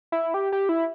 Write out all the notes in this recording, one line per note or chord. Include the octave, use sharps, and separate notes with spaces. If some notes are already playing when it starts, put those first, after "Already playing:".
E4
G4
G4
E4